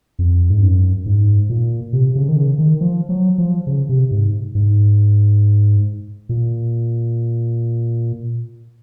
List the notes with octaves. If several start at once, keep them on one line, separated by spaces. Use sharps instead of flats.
F2
G#2
F#2
G#2
A#2
C3
C#3
D#3
C#3
D#3
F3
F#3
F3
C#3
C3
G#2
G#2
A#2